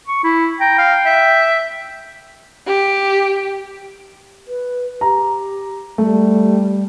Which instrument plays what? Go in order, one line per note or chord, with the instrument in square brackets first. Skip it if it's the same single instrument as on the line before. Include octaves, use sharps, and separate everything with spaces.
[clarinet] C#6
E4
[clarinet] G5 [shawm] A#5
[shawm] F5
E5
[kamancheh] G4
[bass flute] B4
[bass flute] G4 [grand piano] A#5
[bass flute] G3 [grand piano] A3